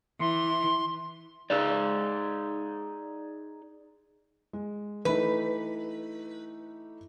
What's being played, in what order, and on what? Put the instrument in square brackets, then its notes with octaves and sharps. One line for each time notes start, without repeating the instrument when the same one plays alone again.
[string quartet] E3 [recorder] C6
[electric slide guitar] D#4 G#4 D5
[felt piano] G#3
[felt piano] E3 A3 D#4 [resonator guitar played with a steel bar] B4